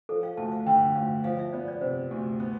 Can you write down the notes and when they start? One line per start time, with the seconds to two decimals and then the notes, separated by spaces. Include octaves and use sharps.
0.09 F3 A4
0.23 F5
0.37 D2 A5
0.52 F5
0.66 D3 G5
0.95 D2 F5
1.24 F3 F5
1.39 E5
1.53 B3 D5
1.68 D5
1.81 C3 C5
2.11 D2
2.40 B3